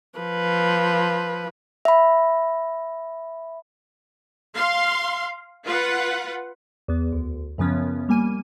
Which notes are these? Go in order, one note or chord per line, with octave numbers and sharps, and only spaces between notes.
F3 B4
E5 B5
F5 C6
F4 B4 F#5
E2 B3
D2
F#2 C#3 F3 B3 C#4
G3 A#3 G#5 D#7